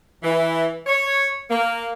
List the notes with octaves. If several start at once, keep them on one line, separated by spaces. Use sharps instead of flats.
E3
C#5
A#3